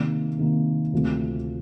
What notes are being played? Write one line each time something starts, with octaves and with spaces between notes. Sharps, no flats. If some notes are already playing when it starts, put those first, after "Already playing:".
Already playing: C3 D#3 A#3
C3 D#3 A#3
D2 C3 F3 A3